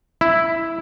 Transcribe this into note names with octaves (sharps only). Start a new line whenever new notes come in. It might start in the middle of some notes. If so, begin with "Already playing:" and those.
E4